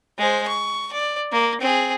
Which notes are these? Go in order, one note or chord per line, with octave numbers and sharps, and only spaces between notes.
G#3 C5
C#6
D5
A#3
C4 G#4